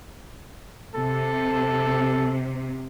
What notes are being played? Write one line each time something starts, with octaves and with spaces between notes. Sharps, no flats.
C3 A4